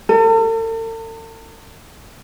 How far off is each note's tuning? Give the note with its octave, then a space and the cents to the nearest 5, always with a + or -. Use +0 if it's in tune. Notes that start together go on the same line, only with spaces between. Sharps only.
A4 +45